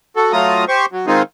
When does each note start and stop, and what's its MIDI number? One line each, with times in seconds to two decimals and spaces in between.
0.16 0.32 66
0.16 0.32 69
0.32 0.65 54
0.32 0.65 57
0.32 0.65 65
0.32 0.65 82
0.32 0.65 87
0.68 0.86 67
0.68 0.86 72
0.68 0.86 85
0.92 1.06 54
1.07 1.22 51
1.07 1.22 56
1.07 1.22 60
1.07 1.22 63
1.07 1.22 65
1.07 1.22 68